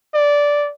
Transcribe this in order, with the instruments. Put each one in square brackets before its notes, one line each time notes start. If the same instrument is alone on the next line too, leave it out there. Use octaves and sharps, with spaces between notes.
[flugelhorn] D5